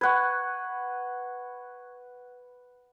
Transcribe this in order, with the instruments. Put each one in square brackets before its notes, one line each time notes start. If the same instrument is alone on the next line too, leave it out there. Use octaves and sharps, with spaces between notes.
[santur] B4 F#5 [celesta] C#6 F#6 G#6